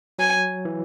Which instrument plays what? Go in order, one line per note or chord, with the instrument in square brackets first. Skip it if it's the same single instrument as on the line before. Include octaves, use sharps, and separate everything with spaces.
[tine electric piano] F#3 [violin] G#5
[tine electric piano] E3